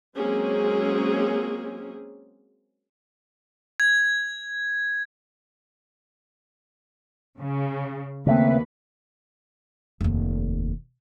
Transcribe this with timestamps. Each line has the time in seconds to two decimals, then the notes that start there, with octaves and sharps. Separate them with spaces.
0.15 F#3 G#3 A#3 C4 C#4 G#4
3.80 G#6
7.39 C#3
8.27 D#2 C#3 A3 C4 B4
10.01 F1 D#2